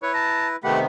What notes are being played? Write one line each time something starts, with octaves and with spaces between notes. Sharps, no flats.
E4 B4 C#5
A5 A#5
C3 D#3 A3 B3 G4 F#5 B5